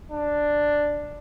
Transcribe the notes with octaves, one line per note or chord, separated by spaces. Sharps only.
D4